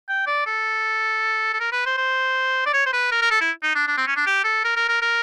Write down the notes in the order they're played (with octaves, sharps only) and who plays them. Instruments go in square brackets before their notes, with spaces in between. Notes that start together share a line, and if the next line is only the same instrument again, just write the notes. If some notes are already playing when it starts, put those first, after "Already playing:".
[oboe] G5
D5
A4
A4
A#4
B4
C5
C5
D5
C#5
C5
B4
A#4
A#4
A4
E4
D#4
D4
D4
C4
C#4
D4
G4
A4
A#4
A#4
A#4
A#4